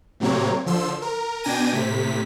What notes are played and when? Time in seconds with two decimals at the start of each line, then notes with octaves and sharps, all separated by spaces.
0.20 A2 C3 F#3 A#3 C4 C#5
0.66 D3 F3 C6 E6
1.02 A#4
1.43 B2 D4 G5 G#5 A#6 D#7
1.72 A2 C3 B6